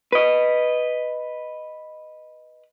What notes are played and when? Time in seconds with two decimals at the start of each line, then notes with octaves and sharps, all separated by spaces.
0.12 B4 D#5